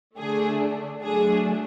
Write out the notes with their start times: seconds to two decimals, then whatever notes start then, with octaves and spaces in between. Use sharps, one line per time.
0.17 D3 A3 D4 G#4
1.02 F#3 A3 D4 G#4